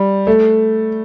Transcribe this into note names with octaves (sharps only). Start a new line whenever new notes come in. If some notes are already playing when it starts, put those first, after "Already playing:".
Already playing: G3
A3